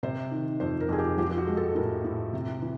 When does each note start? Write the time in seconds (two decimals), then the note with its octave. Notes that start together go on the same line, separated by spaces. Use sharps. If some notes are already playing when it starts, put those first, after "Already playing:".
0.03 C3 C5
0.31 D#3
0.60 F2 C5
0.80 A#4
0.89 F2 G#4
0.98 G4
1.18 F3 G4
1.30 G4
1.38 F#4
1.47 G#3
1.57 A4
1.75 A2 A#4
2.04 A2
2.33 C3
2.62 E3